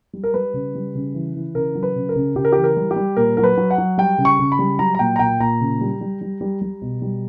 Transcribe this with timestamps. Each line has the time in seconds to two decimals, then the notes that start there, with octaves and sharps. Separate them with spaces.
0.13 G3
0.24 A#4
0.34 G3 B4
0.54 C#3
0.75 G3
0.95 C#3
1.14 E3
1.35 E3
1.55 C#3 A#4
1.75 F#3
1.83 B4
1.96 C#3
2.09 A#4
2.16 C#3
2.36 C#3 G4
2.45 A#4
2.52 E3 G4
2.64 A#4
2.76 G3
2.91 G4
2.96 G3
3.17 A#2 A#4
3.37 F#3 A#4
3.44 B4
3.57 F#3
3.71 F#5
3.78 F#3
3.98 G3 G5
4.18 C#3
4.25 C#6
4.39 C#3
4.52 B5
4.59 G3
4.79 F#3 A#5
4.95 A#5
4.99 A#2 G5
5.16 A#5
5.19 A#2 G5
5.40 A#2 A#5
5.61 C#3
5.81 G3
6.01 G3
6.21 G3
6.41 G3
6.61 G3
6.82 B2
7.02 G3